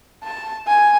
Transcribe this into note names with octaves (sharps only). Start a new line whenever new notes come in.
A5
G#5